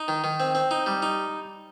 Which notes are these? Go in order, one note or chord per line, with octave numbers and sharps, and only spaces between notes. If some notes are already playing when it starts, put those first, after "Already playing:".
Already playing: D#4
D#3
D#3
C4
C4
D#4
G3
D#4